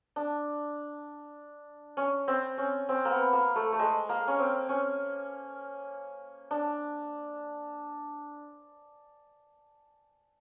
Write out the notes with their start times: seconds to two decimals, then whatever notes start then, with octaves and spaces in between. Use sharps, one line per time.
0.16 D4
1.97 C#4
2.28 C4
2.58 C#4
2.89 C4
3.05 A#3
3.11 B3
3.33 A#3
3.56 A3
3.72 A3
3.79 G#3
4.09 A#3
4.28 C#4
4.39 C4
4.69 C#4
6.51 D4